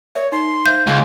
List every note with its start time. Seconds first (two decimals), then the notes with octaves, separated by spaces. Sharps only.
0.15 A#4 C#5 D5 E5
0.32 D#4 C6
0.66 C5 E5 F5 G6
0.87 C#2 G4 G#4 F5 C6